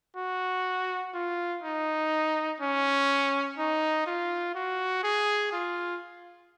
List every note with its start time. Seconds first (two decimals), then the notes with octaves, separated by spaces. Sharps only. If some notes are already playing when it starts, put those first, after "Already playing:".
0.17 F#4
1.14 F4
1.64 D#4
2.61 C#4
3.58 D#4
4.07 F4
4.55 F#4
5.04 G#4
5.53 F4